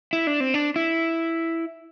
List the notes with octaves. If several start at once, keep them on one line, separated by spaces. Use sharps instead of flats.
E4
D4
C4
D4
E4